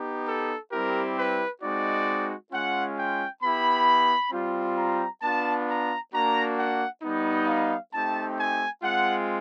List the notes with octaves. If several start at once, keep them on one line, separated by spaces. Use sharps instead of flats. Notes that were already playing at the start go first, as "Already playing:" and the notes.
Already playing: B3 D#4 G4
A4
G3 C4 E4 G4 A#4
B4
G#3 C4 D#4 F#4 D5
G#3 C#4 F4 F#5
G5
B3 E4 G4 B5
G3 C4 F4
A#5
B3 D4 F4 A5
A#5
A#3 D4 F#4 A#5
F#5
G3 B3 D#4
F5
A3 C4 D#4 G4 A5
G#5
G#3 C4 F4 F#5